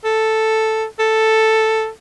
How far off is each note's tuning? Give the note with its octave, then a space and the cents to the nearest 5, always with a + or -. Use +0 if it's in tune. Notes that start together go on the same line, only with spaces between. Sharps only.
A4 +0
A4 +5